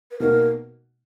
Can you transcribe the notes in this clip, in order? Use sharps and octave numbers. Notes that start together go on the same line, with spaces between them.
B4
B2 A#3 D#4 F#4 A#4